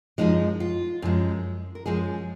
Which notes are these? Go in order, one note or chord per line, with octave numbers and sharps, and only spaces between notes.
F#2 F3 G#3 D#4
F4
F#2 F3 G#3
A#4
F#2 F3 G#3 G#4